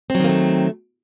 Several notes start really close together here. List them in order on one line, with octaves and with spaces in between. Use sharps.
C4 F#3 D#3 A#3 A3